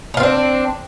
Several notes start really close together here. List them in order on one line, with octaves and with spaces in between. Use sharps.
D#4 F4 C4 D4